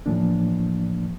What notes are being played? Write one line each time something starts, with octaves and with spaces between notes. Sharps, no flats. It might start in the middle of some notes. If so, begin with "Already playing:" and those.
A2 E3 F3 A#3 D4